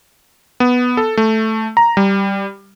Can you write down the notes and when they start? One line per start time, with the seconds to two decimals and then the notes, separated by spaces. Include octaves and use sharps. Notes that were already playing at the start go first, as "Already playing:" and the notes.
0.60 B3
0.97 A4
1.17 A3
1.77 A#5
1.97 G3